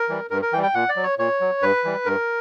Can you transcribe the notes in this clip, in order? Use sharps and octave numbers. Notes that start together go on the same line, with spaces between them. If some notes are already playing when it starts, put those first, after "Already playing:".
Already playing: A#4
E3 G3
G2 A#4
A#4
E3 G3 G5
G5
A#2 F#5
D5
F#3
C#5
A#2 C#5
F#3
G2 B4
E3 G3
G2 A#4